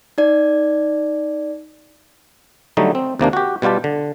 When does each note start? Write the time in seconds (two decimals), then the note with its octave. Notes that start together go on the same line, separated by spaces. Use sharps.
0.18 D#4 D5
2.77 D3 F#3 G3 A3 D#4
2.95 C4
3.19 D#2 C3 A#3 D4
3.33 F#4 G4
3.62 B2 G3 F4 G4 A5
3.84 D3